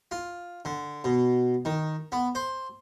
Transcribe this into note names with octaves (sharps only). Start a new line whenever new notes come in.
F4
D3
B2
D#3
B3
C5